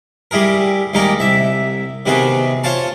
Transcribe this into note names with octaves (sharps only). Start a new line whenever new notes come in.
G3 E4 G#4 A#4
D#2 G3 G#3 D#4 A#4
C2 E5
C3 D#3 B3 F#4 G#4
F4 C5 C#5 F5 A5